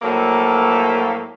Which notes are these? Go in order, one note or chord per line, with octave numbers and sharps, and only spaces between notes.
A2 F3 F#3 A#3 A4